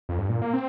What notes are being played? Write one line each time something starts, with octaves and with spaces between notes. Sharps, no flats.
F2
G2
A#2
A#3
C4